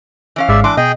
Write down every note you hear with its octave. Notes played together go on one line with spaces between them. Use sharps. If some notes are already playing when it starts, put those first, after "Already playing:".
E3 C#4 F5
G#1 G#2 G#3 D5 E5
E3 D4 C6 D6
B2 G#4 D#5 G5